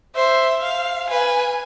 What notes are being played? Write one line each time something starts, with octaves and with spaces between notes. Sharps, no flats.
C5 E5
F5
B4 G#5